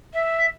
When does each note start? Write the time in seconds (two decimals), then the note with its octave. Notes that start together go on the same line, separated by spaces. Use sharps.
0.13 E5